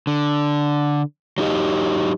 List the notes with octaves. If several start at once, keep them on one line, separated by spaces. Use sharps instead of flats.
D3
F#3 D#4 G4 D#5